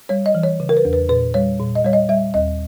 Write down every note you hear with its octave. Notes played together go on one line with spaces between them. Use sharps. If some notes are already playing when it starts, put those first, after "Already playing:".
G3 C#5
D#5
E3
C#5
C#3
A#4
B4
E2
B4
A#2 B4
G3 C#5
A#2
D#5
G3 C#5
D#5
G3 E5
D#2 D#5